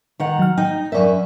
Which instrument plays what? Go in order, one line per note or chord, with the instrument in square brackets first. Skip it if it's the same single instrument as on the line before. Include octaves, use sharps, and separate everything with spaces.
[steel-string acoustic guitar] D#3 F#5 A#5
[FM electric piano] F#3 F6
[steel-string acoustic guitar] D#4 [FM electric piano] G5
[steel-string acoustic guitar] F#2 C#4 E5 [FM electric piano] A#4 D5